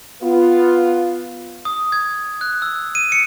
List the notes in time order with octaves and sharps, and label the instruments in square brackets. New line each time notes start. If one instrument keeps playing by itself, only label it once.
[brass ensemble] B3 F4
[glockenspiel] D#6
G#6
F#6
E6
D#7
C#7